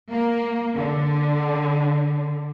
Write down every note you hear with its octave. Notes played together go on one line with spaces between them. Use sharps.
A#3
D3